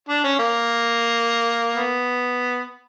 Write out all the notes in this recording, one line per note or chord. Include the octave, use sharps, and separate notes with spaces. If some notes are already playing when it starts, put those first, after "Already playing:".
D4
C#4
A#3
B3